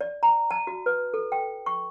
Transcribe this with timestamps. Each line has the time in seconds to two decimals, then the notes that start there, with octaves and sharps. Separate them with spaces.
0.01 D5
0.23 A#5
0.51 A5
0.67 F#4
0.86 B4
1.14 A4
1.32 G5
1.66 C#6